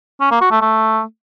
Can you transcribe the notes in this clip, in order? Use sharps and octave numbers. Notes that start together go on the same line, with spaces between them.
C#4
A#3
F#4
A3
A3